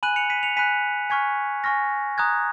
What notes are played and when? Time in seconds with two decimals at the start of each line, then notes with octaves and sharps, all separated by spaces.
0.03 G#5 B5 F#6 D#7 F#7
0.16 C#7 F7
0.30 B6 D#7
0.43 C#7 F7
0.56 G#5 B5 F#6 B6 D#7
1.10 G#5 C#6 F6 G#6 B6
1.64 G#5 C#6 F6 A#6
2.18 A#5 D#6 F#6 G#6